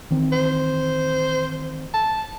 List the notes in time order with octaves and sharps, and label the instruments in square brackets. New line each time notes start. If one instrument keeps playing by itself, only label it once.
[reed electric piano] D#3 E3 C4
[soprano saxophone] C5
A5